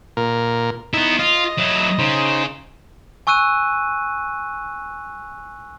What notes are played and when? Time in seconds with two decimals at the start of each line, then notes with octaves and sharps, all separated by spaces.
0.17 A#2 A#4
0.94 B3 D#4 E4
1.19 F4 D#5
1.58 F#3 E4
1.99 C#3 D#4 C5
3.27 G#5 C#6 E6 F#6 D#7